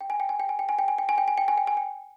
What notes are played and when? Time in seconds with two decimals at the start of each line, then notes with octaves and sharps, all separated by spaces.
0.01 G5
0.10 G#5
0.20 G5
0.29 G#5
0.40 G5
0.49 G#5
0.59 G5
0.69 G#5
0.79 G5
0.88 G#5
0.98 G5
1.09 G#5
1.18 G5
1.28 G#5
1.38 G5
1.48 G#5
1.58 G5
1.67 G#5
1.77 G5